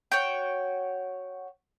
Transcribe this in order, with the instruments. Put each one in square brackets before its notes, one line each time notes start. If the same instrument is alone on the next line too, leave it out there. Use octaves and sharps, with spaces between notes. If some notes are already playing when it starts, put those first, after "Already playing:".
[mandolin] F#4 C#5 G5